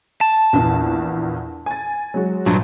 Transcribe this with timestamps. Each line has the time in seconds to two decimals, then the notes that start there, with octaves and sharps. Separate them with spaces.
0.21 A5
0.53 A#1 E2
1.66 G#5 A6
2.14 F#3 G#3 F#4
2.46 A#1 G2 F3 F#3